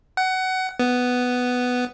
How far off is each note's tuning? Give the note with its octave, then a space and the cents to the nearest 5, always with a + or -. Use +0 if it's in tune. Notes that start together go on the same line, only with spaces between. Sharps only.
F#5 +20
B3 +5